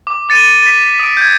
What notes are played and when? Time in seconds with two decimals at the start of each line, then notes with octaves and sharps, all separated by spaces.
0.07 D6
0.29 D6 A6 C#7 D#7
0.62 A6 B6
0.84 B6
0.99 D#6 B6 D7
1.17 G6 G#6